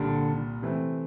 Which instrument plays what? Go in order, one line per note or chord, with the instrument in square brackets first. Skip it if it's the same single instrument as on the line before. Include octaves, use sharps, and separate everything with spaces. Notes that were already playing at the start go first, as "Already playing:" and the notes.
Already playing: [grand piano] C2 A#2 G3 [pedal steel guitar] D3
[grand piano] C3 E3 A3 C4